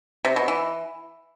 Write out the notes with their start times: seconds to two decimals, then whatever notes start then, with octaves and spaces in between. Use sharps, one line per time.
0.25 C3
0.36 B2
0.48 E3